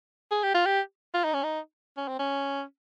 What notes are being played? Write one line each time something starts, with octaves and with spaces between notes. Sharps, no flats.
G#4
G4
F4
G4
F4
D#4
C#4
D#4
C#4
C4
C#4